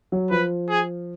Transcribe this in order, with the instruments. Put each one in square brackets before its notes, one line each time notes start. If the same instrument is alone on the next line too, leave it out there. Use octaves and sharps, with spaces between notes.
[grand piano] F#3
[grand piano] F3 [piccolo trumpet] B4
[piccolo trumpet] G#4